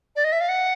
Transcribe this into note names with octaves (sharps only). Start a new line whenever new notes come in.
D5
D#5
E5
F5
F#5